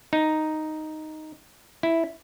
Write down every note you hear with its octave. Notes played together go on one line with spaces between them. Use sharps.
D#4
E4